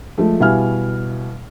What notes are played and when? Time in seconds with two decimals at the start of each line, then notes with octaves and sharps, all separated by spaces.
0.18 F3 G#3 A3
0.40 B2 G3 E4 F5 G#5 F6